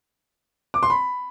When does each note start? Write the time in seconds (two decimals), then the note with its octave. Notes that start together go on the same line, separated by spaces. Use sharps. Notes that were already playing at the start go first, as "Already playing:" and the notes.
0.74 D6
0.83 C6
0.90 B5